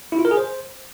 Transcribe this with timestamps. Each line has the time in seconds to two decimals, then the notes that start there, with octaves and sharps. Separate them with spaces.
0.12 E4
0.19 F4
0.25 A#4
0.31 G#4
0.37 C5